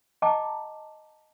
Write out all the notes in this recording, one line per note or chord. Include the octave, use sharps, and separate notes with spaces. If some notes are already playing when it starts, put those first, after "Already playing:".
D#5 G5 A5 A#5 D6